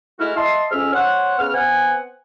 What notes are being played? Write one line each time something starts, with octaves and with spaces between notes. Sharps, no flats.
G#3 A3 E4 F#4 F6
D#5 E5 A5 C6
F2 G#2 C#4 E5 F6
C5 C#5 F#5
C#3 B3 F6
B3 C4 F#5 G#5